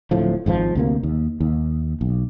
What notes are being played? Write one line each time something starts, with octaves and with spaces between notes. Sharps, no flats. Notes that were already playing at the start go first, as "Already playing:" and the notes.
D1 A2 F3
G#1 G#2 E3 F3
D2 C3 A#3
D#2
D#2
B1